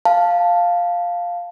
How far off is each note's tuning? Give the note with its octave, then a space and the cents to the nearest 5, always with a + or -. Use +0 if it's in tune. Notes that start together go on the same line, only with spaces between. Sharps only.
F5 +0 A5 +0